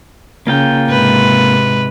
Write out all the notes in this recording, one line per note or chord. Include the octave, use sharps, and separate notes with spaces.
C#3 A#3 F4 G5
G#2 C3 B4